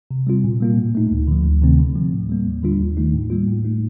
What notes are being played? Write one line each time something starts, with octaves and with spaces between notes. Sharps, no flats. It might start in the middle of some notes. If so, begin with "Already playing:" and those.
C3
G3 C4 F4
A#2
G3 A#3 F4
A2
A3 D#4
D2
D3 F3
D2
C3 D#3 A3 C4
D3
F3 C4
A2
G3 A#3
D#2
D3 G3 D4 F4
D#2
D#3 A3 D#4
A2
G3 A#3 F4
A2
A3 D#4